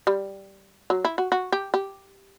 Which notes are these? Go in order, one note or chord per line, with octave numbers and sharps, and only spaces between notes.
G3
F#3
E4
F#4
F#4
G4
G4